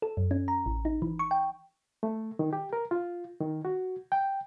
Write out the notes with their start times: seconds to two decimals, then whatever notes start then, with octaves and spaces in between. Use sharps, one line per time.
0.02 A4
0.17 F#2
0.31 C#4
0.48 A#5
0.66 A1
0.85 D#4
1.02 E3
1.19 C#6
1.31 G5
2.03 A3
2.39 D#3
2.53 G4
2.73 A#4
2.91 F4
3.40 D#3
3.65 F#4
4.12 G5